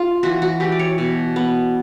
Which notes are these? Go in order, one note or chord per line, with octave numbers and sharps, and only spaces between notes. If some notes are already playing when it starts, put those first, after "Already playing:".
Already playing: F4
E3 F#4
F#4
E3 G4
D5
C#5
B2
B3